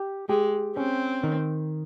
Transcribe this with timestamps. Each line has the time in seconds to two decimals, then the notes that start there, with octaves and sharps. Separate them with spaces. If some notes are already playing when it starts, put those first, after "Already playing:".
Already playing: G4
0.29 G#3 G4
0.77 C4 C#4
1.23 D#3